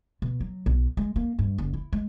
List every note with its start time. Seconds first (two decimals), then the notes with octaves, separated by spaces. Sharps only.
0.22 B2
0.40 F#3
0.66 B1
0.97 G#3
1.16 A#3
1.39 G2
1.58 F#1
1.74 E4
1.93 G#3